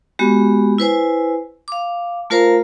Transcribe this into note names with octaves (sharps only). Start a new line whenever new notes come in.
G#3 B3 F#4 G4
E4 B4 C5 G#5
F5 D6
A3 F4 A#4 C5 F5 A#5